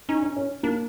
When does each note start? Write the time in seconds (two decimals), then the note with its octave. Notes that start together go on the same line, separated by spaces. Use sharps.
0.09 C#4 D#4
0.22 D4
0.36 C#4
0.63 A#3 D4